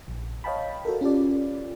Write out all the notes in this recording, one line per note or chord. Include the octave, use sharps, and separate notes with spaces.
A#1
C#5 D#5 F5 G5 A5 B5
F#4 A4 A#4
C#4 F4 G4 D5